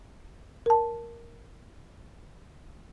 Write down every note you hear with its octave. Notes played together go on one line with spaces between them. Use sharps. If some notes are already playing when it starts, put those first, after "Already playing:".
A#4 A5